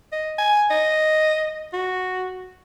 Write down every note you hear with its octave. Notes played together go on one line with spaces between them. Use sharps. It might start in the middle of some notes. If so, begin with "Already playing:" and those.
D#5
G#5
D#5
F#4